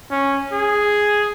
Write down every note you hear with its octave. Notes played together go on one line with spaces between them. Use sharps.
C#4
G#4